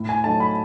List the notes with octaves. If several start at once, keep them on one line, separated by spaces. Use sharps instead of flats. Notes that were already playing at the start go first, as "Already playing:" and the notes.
Already playing: A2
G#5
F#3 A3 D#4 A5
B5